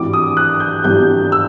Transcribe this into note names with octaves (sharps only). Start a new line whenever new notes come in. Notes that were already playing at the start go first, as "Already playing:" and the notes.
Already playing: G#1 G2 E3 G3 D6
D#6
F#6
G6
G#1 G2 E3 G3 G6
E6